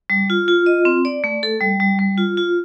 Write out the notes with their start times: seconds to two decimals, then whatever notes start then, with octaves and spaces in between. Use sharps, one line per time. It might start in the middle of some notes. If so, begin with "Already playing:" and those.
0.10 G3
0.30 F4
0.48 F4
0.66 D#5
0.85 C4
1.05 D5
1.24 A3
1.43 A4
1.61 G3
1.80 G3
1.99 G3
2.18 F4
2.37 F4